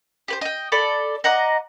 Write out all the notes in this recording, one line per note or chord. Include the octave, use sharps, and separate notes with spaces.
G4 B4 C5
D#5 G5
A4 D5 B5
D#5 F#5 A#5 D6